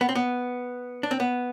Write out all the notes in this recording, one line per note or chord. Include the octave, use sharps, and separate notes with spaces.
B3
C4
B3
D4
C4
B3